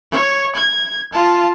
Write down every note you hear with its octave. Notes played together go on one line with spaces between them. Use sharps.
C#5
G#6
F4 A5